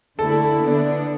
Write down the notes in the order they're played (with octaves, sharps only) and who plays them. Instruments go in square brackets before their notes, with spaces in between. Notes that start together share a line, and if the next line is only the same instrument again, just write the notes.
[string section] D3 A3 E4 [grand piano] A4
[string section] D3 B3 D4